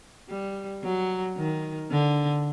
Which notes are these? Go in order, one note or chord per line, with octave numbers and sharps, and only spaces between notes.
G3
F#3
D#3
D3